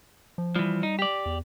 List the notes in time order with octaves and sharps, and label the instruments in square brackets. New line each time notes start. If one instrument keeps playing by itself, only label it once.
[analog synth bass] F3
[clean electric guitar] E3 F3 [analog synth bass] G3
[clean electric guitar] D#4
G4 D5
[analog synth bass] E2